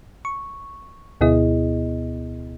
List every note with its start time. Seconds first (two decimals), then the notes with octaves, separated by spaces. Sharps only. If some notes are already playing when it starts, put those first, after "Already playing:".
0.25 C#6
1.21 D2 B2 B3 E4 G#4 D#5